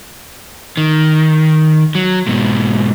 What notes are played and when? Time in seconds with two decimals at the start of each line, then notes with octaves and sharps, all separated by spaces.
0.77 D#3
1.95 F#3
2.27 G#2 B2